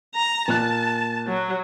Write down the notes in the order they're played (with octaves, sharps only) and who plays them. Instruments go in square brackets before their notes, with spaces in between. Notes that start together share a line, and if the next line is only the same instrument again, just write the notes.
[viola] A#5
[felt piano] A#2 F#6 [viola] A5
[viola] F#3